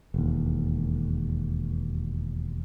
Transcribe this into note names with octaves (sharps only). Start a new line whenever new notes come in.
E1 D#2